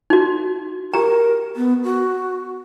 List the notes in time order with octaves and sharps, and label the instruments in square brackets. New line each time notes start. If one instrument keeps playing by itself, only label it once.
[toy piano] D#4 F#4
[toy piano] G4 A#5 [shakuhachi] A#4
[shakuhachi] B3
F#4